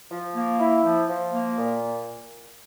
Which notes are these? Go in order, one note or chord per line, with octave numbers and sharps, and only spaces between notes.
F3
A#3
E4
F3
F3
A#3
A#2